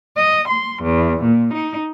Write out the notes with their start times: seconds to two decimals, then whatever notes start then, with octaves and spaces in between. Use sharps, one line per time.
0.16 D#5
0.47 C6
0.83 E2
1.22 A#2
1.53 D#4